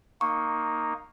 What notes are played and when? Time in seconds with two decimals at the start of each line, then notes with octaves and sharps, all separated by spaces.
0.21 A#3 D#4 C#6